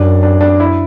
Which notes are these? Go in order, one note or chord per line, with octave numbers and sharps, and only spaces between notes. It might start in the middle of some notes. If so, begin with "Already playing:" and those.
Already playing: F#2 D4
D4
D4
E4